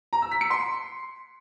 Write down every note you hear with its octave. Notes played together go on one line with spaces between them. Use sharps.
A#5
E6
B6
C#7
C6